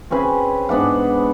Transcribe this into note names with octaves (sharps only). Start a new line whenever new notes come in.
C4 C#4 G#4 B4
G#2 B3 D4 F#5